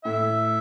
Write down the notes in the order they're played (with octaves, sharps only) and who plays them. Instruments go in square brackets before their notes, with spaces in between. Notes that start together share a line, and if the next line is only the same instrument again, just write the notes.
[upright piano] A2 [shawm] E5